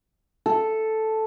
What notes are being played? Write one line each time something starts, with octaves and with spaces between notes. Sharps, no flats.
A4